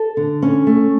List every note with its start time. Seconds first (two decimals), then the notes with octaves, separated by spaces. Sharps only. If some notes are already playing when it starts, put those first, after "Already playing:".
Already playing: A4
0.17 D3
0.42 C#4
0.67 A3